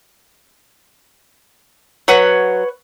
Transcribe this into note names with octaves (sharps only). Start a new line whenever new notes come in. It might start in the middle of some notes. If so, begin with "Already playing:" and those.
F#3 B4 C#5 F#5